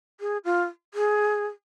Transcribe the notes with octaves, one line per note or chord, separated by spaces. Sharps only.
G#4
F4
G#4